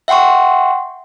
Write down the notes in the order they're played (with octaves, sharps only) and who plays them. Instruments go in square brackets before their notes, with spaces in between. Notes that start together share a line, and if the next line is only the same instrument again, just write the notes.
[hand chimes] E5 F#5 G5 C6 C#6